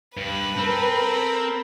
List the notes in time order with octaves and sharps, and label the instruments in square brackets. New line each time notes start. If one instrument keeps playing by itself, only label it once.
[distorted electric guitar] G2 [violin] B4
[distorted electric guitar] C4 [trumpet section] A4 A#4 B5